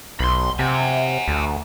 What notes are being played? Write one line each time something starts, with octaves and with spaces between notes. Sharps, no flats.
B1 B5 C6
C3 F#5 G#5
D2